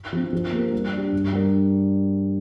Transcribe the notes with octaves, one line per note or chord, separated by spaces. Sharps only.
F3 C4
F3
A#3 G4 A#4
G3
D4 G4
G2
G3 D4 A#4